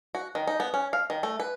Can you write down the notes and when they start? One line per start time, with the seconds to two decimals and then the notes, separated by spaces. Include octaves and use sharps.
0.15 F#4
0.35 D#3
0.47 D#4
0.60 B3
0.74 C#4
0.93 F5
1.10 D#3
1.23 A3
1.40 B4